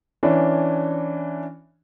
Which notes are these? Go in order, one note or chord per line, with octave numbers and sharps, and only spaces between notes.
E3 C#4 D4